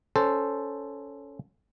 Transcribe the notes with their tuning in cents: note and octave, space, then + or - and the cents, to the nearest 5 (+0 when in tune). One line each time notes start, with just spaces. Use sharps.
C#4 +10 A4 +0 C5 -5